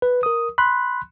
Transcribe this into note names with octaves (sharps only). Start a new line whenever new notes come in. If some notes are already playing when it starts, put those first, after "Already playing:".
B4
A#4 D#6
B5 C6 F#6